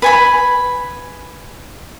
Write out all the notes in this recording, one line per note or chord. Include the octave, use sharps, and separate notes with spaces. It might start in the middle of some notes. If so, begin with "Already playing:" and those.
B4 G#5 B5